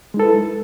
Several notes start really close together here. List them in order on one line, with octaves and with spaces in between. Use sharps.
G#3 D#4 A4 B4 E4